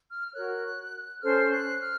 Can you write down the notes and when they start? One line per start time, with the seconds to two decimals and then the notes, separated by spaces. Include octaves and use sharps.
0.11 F6
0.26 F6
0.33 F#4 A#4 C#5 F#6
1.21 C#4 A4 C5 F6
1.51 F#6
1.81 F6